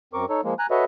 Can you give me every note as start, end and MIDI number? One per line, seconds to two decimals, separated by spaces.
0.13 0.25 42
0.13 0.25 60
0.13 0.25 70
0.13 0.25 85
0.13 0.25 86
0.29 0.41 63
0.29 0.41 69
0.29 0.41 73
0.44 0.54 53
0.44 0.54 56
0.44 0.54 58
0.59 0.66 80
0.59 0.66 82
0.59 0.66 90
0.71 0.85 66
0.71 0.85 69
0.71 0.85 71
0.71 0.85 73
0.71 0.85 75
0.71 0.85 76